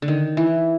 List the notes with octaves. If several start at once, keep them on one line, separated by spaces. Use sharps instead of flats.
D3
D#3
E3